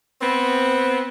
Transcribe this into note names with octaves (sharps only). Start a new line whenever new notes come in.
B3 C4